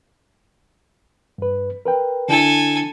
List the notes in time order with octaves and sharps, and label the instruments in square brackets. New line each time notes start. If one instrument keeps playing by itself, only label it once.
[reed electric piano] G2 B4
A#4 B4 G5
[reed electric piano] D3 D4 E4 [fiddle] A4 G#5